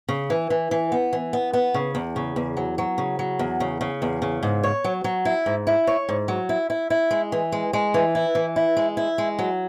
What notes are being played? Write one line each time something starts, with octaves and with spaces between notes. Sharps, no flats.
C#3
E3
E3
E3
B3
E3
B3
B3
C#3
E2
C#3
E2
F#3
F#3
C#3
F#3
E2
C#3
C#3
E2
C#3
G#2
C#5
F#3
F#3
E4
G#2
E4
C#5
G#2
F#3
E4
E4
E4
G#3
E3
G#3
G#3
E3
E4
E3
E4
G#3
E4
G#3
F#3